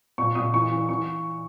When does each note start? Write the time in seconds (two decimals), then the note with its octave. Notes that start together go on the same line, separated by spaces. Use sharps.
0.18 A#2 C#6
0.35 A#2 D#6
0.54 E3 C#6
0.71 E3
0.89 E3 C#6